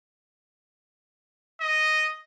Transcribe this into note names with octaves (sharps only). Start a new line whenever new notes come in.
D#5